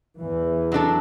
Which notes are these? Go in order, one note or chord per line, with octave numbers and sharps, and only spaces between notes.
E2 E3
F#3 D4 A4